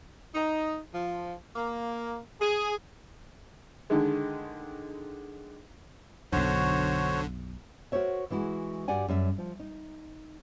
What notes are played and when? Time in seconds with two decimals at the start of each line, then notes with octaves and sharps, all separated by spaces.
0.34 D#4
0.93 F3
1.55 A#3
2.40 G#4
3.90 D3 D#3 G#3
6.33 B1 F#2 D3 F#4 C5 C#5
7.92 F#4 A#4 C5 C#5 E5
8.30 E3 G#3 E4 F#4
8.88 G2 F#4 G4 D5 F#5 G#5
9.08 F#2 G3 E5
9.38 F3
9.60 D#4